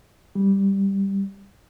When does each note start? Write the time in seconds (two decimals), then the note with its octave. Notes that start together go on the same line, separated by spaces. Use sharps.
0.35 G3